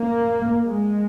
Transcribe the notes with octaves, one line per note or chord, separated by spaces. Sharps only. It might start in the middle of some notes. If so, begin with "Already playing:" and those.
Already playing: A#3
G#3